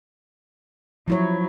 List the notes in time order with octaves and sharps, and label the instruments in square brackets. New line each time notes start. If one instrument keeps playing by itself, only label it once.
[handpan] F3 E4 C#5 [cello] F#3